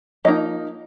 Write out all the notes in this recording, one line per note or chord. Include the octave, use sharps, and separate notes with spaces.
F3 A#3 D#4 D#5